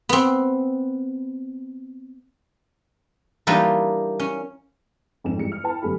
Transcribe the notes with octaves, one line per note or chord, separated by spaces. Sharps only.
B3 C4
E3 G3 A#3 D4 D#4 F4
C#4
F2 G#2 C#4 E7
G2 E3 G#3 C#7
F6
E4 B4 G5 A5
G1 F#2 A3 G4 G#4 B5